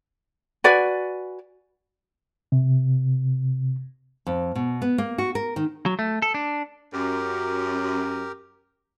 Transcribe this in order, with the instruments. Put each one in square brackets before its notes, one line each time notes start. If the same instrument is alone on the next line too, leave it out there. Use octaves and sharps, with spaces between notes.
[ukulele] F#4 B4 D5 G#5
[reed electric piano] C3
[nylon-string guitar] F2
B2
B3
A#3
F#4
A#4
D#3
[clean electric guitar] F#3
A3
A4
D4
[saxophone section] F#2 [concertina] G4 A#4